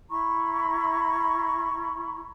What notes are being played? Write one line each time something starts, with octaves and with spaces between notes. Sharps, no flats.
E4 A#5 B5 C#6